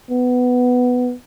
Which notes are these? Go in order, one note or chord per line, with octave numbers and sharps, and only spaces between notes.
B3